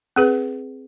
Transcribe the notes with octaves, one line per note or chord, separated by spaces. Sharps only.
C4 G#4 B4